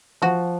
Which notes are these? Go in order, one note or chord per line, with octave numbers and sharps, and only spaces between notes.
F3 F#4